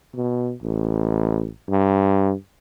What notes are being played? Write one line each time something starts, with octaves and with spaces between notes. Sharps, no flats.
B2
A1
G2